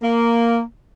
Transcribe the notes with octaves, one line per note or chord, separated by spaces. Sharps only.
A#3